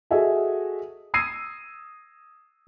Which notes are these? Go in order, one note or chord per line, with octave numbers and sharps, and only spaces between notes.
F#4 G#4 A4 D#5 E5 G#5
D#6 E6 G#6 A#6 C7 D#7